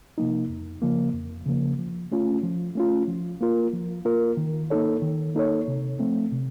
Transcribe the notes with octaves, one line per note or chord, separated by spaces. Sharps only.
C3 F3 A#3 D#4
F2
C#3 F3 A#3
F2
C#3 F3 A#3
F3
A3 C#4 F4
F3
A3 C#4 F4
F3
A#3 F4 A#4
F3
A#3 F4 A#4
D#3
A#3 D#4 A4 C#5
D#3
A#3 D#4 A4 C#5
C3
F3 A3 C4
C3